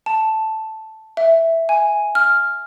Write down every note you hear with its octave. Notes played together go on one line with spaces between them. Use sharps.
A5
E5
G#5
F6